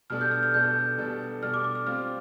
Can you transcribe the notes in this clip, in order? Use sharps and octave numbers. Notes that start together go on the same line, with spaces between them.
B2 G3 D4 A4 F6
G6
F6
F6
B2 G3 D4 A4 G6
B2 G3 D4 A4
B2 G3 D4 A4 F6
D6
D6
F6
G3 C4 F4 F6